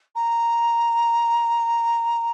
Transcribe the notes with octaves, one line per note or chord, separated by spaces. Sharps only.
A#5